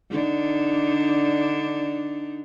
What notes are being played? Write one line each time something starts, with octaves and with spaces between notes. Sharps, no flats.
D3 D4 D#4